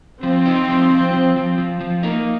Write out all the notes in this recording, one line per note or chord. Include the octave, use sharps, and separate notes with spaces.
F3 C4
D#4
F3
F3
F3
F3
F3
F3
A#3 D#4